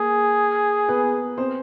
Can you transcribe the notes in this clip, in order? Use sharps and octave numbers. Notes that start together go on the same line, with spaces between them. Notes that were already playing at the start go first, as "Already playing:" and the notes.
Already playing: A#3 G#4
B3 B4
C4 C5